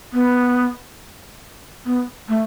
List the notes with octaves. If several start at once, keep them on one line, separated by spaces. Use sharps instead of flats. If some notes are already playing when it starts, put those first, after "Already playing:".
B3
B3
A3